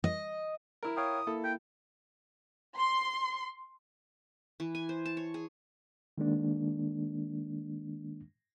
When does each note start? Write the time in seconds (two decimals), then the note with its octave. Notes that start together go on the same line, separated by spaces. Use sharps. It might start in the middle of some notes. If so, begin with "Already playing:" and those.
0.04 D#5
0.83 E4 A#4
0.97 C#5 F5 G5 D#6
1.27 A#3 E4 A4
1.44 G5
2.78 C6
4.60 E3
4.75 G#5
4.89 C5
5.06 A5
5.17 C#5
5.34 G#4
6.18 D#3 G#3 A#3 D4